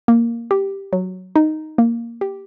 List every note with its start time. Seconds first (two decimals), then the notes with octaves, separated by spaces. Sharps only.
0.08 A#3
0.51 G4
0.93 F#3
1.36 D#4
1.78 A#3
2.21 G4